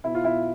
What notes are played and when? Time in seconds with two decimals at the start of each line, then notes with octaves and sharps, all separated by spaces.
0.04 B2 E4
0.15 F4
0.24 B2 E4